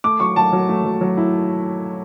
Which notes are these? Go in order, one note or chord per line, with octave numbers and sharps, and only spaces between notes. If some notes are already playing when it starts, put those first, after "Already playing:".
A3 D6
F#3 C#6
F#3 A5
F#3
A3
F#3
F#3
E4